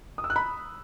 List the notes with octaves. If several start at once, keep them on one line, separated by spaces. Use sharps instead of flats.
D#6
E6
F#6
B5